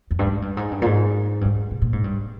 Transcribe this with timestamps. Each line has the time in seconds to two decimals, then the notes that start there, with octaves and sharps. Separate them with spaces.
0.11 F2
0.19 G2
0.27 G#2
0.42 G2
0.57 G#2
0.71 G2
0.82 A#2
0.86 G#2
1.41 G2
1.45 G#2
1.71 C3
1.82 A#2
1.93 G#2
2.04 G2